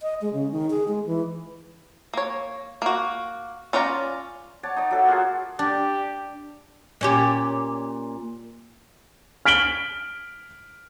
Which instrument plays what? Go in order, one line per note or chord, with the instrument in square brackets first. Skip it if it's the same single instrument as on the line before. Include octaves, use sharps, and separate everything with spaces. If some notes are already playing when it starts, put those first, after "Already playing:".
[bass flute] D#5
G#3
C#3
D#3
G#4
G#3
E3
[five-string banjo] A#3 C#5
A#3 F#4
C#4 F4 D5 F#5 A#5
[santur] C#5 D5 F#5 A5
D#4 D5
F#3 A4 E5
A#3 F4 F#4 G#4
[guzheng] D4 [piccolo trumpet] G4
[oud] A#2 C#4 G4
[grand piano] F6 B6 D7 F#7 G7